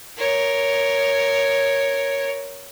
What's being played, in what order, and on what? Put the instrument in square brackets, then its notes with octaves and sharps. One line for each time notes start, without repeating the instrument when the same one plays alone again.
[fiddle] A#4 C#5